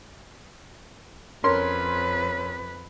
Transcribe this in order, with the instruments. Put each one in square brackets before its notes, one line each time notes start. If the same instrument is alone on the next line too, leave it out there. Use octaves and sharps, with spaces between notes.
[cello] F2 B4 [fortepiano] C#4 A#4 C6